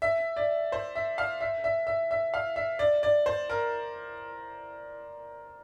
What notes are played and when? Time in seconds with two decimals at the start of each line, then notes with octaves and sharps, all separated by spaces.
0.02 E5
0.37 D5
0.72 C5
0.95 E5
1.18 F5
1.41 E5
1.64 E5
1.87 E5
2.11 E5
2.34 F5
2.56 E5
2.79 D5
3.03 D5
3.26 C5
3.50 A#4